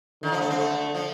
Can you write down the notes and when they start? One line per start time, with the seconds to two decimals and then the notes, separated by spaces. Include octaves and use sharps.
0.23 D3 D#3
0.32 F3
0.41 A3
0.50 C4
0.59 A3
0.95 F3